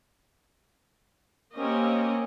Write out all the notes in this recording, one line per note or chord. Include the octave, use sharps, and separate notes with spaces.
A#3 C4 C#4 G4 D#5